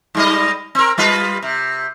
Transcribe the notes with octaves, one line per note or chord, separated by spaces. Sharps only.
G#2 G3 D#5
C4 A#4
G3 F4 B4
C3